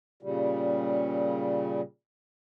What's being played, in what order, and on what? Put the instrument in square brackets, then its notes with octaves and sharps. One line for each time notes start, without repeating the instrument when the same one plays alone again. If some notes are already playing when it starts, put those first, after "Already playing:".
[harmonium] A#2 C#3 G3